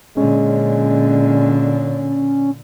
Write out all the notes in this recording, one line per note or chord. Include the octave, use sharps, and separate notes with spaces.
A#2 D3 G#3 C#4